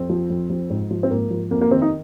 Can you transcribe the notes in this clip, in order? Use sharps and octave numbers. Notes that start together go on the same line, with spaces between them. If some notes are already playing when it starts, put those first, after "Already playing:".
Already playing: F2 C4
F3
F2
F3
G#2
F3
C4
G#2 A#3
F3
F2 A#3
A#3
D#3 C4
D#4